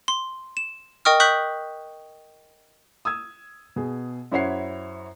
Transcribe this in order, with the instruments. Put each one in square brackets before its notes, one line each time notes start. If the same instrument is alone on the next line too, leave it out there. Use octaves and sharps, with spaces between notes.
[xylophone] C6
E7
A#4 D#5 G5 C#6 D#6 F6
C#6 D#6 F#6 G6 B6 F#7
[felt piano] D#6 E6 G#6
B2 G#4
F#2 E4 C5 C#5 F#5 C7